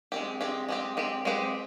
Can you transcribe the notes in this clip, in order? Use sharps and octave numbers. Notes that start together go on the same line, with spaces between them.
G#3 C4 G4
G#3 C4 G4
G#3 C4 G4
G#3 C4 G4
G#3 C4 G4 B4